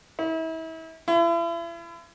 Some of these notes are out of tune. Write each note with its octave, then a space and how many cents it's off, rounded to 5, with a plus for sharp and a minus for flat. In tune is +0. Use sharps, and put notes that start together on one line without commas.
E4 -35
E4 +40